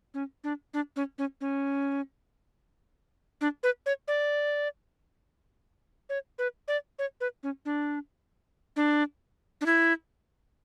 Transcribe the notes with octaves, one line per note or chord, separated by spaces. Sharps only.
C#4
D4
D4
C#4
C#4
C#4
D4
B4
C#5
D5
C#5
B4
D5
C#5
B4
C#4
D4
D4
D4
E4